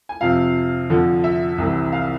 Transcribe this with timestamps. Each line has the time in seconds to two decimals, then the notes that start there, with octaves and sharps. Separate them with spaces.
0.09 G#5
0.21 F2 C3 F3 F5
0.89 F2 D3 F3
1.24 E5
1.58 C2 C3 E3
1.92 F5